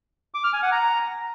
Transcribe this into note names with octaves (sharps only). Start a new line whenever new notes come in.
D6
F6
G#5
F#5
A#5